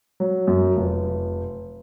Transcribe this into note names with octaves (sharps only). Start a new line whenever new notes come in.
F#3
F#2
F1